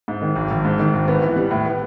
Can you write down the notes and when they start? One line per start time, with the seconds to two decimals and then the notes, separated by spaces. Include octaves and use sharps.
0.08 G#2
0.22 D#3
0.36 G#1
0.51 G#1
0.65 G#2
0.79 D#3
0.93 G#1
1.08 B3
1.23 E3
1.36 G3
1.51 A2
1.65 B3